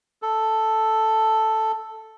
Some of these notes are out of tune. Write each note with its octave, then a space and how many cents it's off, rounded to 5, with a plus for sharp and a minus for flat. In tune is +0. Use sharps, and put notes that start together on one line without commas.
A4 +0